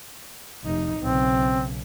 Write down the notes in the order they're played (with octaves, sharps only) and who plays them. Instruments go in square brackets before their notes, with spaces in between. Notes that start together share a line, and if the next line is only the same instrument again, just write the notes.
[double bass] F1 D#4
[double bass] B1 C#3 [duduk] C4